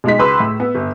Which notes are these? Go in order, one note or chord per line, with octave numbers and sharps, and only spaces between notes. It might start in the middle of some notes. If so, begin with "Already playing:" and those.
B1 G#3 D#4 B6
C#2 B4 C6 E6
A2
B3
G1